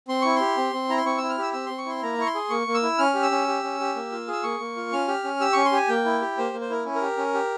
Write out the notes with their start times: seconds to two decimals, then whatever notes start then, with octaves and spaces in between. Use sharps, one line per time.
0.08 C4 C6
0.22 E4 C#6
0.36 G4 C6
0.57 C4
0.73 C4
0.89 E4 A#5
0.97 C6
1.05 C4 C#6
1.18 E4 E6
1.29 F6
1.38 G4 E6
1.53 C4 E6
1.66 C4 C6
1.78 C#6
1.86 E4 C6
2.03 A#3 A#5
2.18 E4 C#6
2.26 C6
2.35 G#4
2.50 A#3 C#6
2.67 A#3
2.74 E6
2.83 E4
2.98 C#4 F6
3.14 G4
3.22 E6
3.31 C#4
3.47 G4
3.63 C#4
3.80 G4
3.96 A#3
4.12 F4
4.28 G#4 E6
4.43 A#3 C#6
4.60 A#3
4.76 F4
4.92 C#4 F6
5.08 G4
5.24 C#4
5.40 G4 E6
5.53 C#4 C#6
5.65 C6
5.72 G4 G#5
5.88 A#3 G5
6.05 E4
6.22 G4
6.38 A#3 C5
6.53 A#3
6.61 C5
6.70 E4 A#4
6.85 C#4
6.95 A#4
7.01 G4
7.18 C#4
7.34 G4